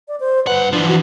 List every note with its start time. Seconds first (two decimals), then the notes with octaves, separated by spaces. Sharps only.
0.08 D5
0.20 C5
0.47 G2 B4 F#5
0.73 E3 F3 D4
0.88 F#4